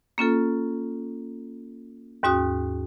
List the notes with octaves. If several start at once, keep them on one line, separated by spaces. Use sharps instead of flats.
A#3 C#4 F4 A4
D#2 G#2 C#4 F#4 D#6 F#6